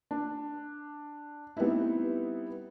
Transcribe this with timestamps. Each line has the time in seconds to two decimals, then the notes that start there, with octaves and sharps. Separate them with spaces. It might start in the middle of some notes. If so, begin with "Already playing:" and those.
0.11 D4
1.57 G3 B3 C4 D#4 E4